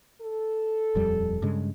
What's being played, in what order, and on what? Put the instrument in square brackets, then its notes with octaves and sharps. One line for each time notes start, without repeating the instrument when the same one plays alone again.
[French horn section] A4
[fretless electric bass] D#1 F2 G3
G2 C#3 G#3